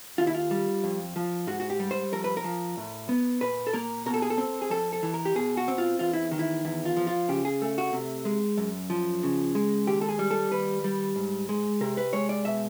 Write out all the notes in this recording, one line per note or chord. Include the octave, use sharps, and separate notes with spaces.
D#2 F4
E4
F4
G3
F2
F3
G#2 F#4
F#4
G4
G3
C5
F2 A#4
B4
A#4
F3
A2
B3
A#2 B4
A4
A#3 A#4
B2 A#4
A4
G#4
A4
C4
G#4
F2 A4
A4
E3
A#4
G4
B2 G#4
F#4
C4
F4
E2 F4
E4
D#3
E4
E2 E4
F4
F3
F4
C#3 G4
G#4
A3
F#4
C3
G#3
F#2
F3
C#3
G#3
D#2 G4
A4
G#4
G3
A4
D#2 B4
G3
G#2
G#3
C3 A#4
B4
G#3 C#5
D5
B2 E5